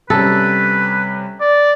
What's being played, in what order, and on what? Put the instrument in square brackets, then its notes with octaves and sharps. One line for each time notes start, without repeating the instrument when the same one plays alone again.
[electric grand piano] C3 G3 C#4 [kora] A4 [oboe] B4
[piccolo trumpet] D5